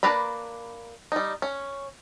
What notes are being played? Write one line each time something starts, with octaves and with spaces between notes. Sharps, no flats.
A#3 D4 B4 A#5 B5
G3 D#4
C#4